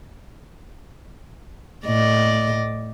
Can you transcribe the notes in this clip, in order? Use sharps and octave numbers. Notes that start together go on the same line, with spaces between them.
A2 D5 D#5